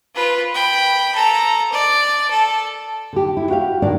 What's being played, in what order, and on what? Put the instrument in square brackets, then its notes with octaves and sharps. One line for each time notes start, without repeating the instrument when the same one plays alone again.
[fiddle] F4 B4
G5 B5
A4 A#5
D5
A4
[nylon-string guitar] D3 G4
E4
F#4 G4 F5
A2 D#3 D4 D#4 A#4 D5